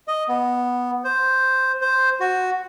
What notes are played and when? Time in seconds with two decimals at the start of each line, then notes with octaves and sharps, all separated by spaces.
0.08 D#5
0.29 B3
1.04 C5
1.82 C5
2.20 F#4